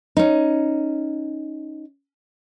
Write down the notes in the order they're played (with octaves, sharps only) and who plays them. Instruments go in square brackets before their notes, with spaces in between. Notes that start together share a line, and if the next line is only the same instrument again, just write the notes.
[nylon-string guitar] C#4 D#4